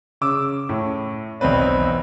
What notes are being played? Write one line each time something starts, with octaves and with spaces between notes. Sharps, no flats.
C#3 D6 E6
A2
B1 E2 C4 B4 D5